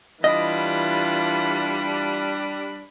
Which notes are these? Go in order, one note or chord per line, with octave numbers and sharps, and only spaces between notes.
E3 G3 D4 F4 D#5 B5